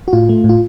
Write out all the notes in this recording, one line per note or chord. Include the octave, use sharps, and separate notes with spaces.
F#4
A2 F4
A3
A2
F4